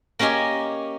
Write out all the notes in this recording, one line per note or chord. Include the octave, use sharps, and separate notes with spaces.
A#3 C#4 G4 D#5 G#5